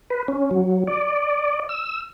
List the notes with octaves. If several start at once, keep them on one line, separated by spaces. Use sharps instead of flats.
B4
C#4
F#3
D5
E6